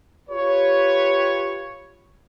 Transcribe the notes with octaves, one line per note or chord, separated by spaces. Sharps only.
F4 G4 B4 C#5